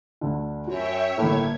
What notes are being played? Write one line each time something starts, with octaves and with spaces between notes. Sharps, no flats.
D2 D3
F#2 F#4 C#5 E5 G5
G1 A2 A#3 G#6